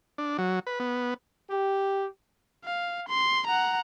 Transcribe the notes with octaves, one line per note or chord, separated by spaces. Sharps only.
D4
F#3
B4
B3
G4
F5
C6
F#5 A#5